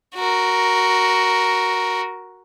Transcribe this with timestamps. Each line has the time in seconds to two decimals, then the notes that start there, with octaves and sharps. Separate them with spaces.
0.15 F#4 A#4